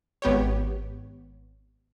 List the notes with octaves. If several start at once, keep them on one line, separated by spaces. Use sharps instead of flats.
G#1 B3 G4 C#5